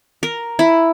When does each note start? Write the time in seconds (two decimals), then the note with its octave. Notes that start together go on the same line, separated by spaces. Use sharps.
0.23 A#4
0.59 E4